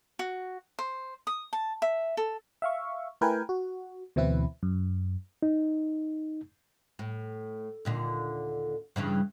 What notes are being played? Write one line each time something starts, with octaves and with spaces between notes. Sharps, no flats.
F#4
C5
D#6
A5
E5
A4
E5 F5 C#6
A3 E4 A#4 B4 G5 G#5
F#4
D2 B2 E3 C4 E4 B4
F#2
D#4
A2
D#2 A#2 D3
G2 C#3 E3